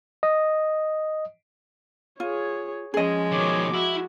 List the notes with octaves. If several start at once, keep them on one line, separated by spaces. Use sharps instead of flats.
D#5
F4 G#4 C#5
F3 G#3 C#4 G#4 D#5
B2 D#3 C#5 D6
E4 F#4